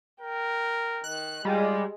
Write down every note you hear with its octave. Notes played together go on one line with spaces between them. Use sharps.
A#4 G5
D#3 F#6
G3 G#3 F4